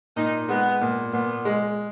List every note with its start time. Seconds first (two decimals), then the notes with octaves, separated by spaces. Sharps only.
0.16 A#2 D#4
0.49 G#3 B3
0.81 A#2
1.13 A#2 B3
1.45 G#3